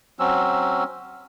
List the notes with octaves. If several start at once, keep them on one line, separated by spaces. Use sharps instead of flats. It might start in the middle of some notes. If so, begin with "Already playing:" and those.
F#3 C4 C#4 E6